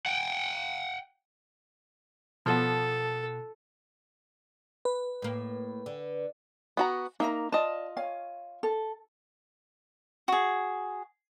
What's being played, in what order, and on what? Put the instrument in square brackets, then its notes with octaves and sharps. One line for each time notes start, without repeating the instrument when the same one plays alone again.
[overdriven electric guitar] F#5 G5
[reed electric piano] B2 [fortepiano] F3 B3 [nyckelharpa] A4
[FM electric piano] B4
[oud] A2 A#3
D3
[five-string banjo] B3 F#4 A#5
[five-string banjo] A#3 [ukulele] D#4 E5 A#5
[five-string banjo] F4 D#5 [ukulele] D5 A5
[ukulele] C#5 F5 G#5
A4
[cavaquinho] F#4 G#4